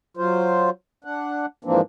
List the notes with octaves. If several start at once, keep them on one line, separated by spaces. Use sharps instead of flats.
F#3 F4 C5
D4 F#5
G#2 E3 F3 A#3 C4 D4